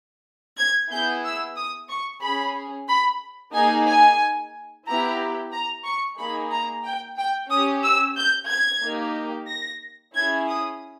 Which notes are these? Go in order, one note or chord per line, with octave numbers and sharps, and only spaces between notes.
G#6
B3 E4 G#4 G6
E6
D#6
C#6
C#4 G#4 B5
B5
A#3 D#4 G#4 G#5
G#5
B3 E4 G4 A#5
A#5
C#6
A#3 D#4 G#4 B5
A#5
G5
G5
C#4 G4 D#6
E6
G6
G#6
A#3 D#4 G4
A#6
C#4 E4 G#4 G#6
D#6